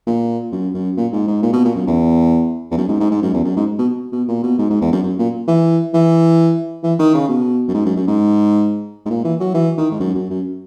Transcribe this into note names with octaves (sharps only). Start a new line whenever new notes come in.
A#2
F#2
F#2
A#2
G#2
G#2
A#2
B2
A#2
F#2
E2
E2
F#2
G#2
G#2
G#2
F#2
E2
F#2
G#2
B2
B2
A#2
B2
G#2
G#2
E2
F#2
F#2
A#2
E3
E3
E3
D#3
C#3
B2
F#2
G#2
F#2
F#2
G#2
G#2
A#2
E3
F#3
E3
D#3
G#2
F#2
F#2
F#2